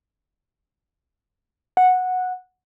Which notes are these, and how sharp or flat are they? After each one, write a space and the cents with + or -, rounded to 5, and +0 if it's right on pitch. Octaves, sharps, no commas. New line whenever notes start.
F#5 -10